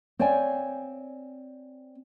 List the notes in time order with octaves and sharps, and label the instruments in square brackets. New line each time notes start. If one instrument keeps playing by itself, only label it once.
[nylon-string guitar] C4 C#5 D5 F5 G5 G#5